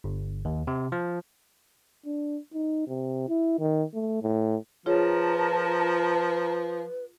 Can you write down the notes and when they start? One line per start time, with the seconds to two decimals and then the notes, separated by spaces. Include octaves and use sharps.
0.04 G1
0.45 D#2
0.67 C3
0.92 F3
2.06 D4
2.54 D#4
2.88 C3
3.29 E4
3.59 D#3
3.94 A3
4.23 A2
4.86 F3 F4 G#4 A#4 B4 C#5 A5